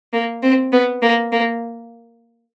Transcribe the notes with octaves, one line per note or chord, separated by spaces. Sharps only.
A#3
C4
B3
A#3
A#3